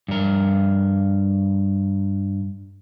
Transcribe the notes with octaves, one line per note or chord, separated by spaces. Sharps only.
G2 A#4